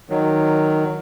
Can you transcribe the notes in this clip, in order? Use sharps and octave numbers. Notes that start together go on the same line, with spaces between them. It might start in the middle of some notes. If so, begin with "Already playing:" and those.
D#3 F#3